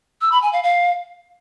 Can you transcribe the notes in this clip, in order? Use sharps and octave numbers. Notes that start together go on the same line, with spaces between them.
E6
B5
G#5
F5
F5